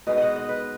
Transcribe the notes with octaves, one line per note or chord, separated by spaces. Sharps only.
B2 G#3 B3 D#4 D#5
D#5 F#5
D#5
B4